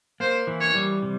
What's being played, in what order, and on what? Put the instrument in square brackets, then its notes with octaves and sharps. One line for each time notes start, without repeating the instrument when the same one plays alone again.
[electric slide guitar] A#3 [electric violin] C5
[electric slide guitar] E3
[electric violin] C#5
[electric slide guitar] G3
C3